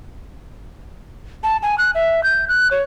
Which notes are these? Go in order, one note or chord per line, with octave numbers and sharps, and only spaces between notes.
A5
G#5
F#6
E5
G6
F#6
C#5